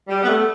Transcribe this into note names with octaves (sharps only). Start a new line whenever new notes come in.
G3
B3
A3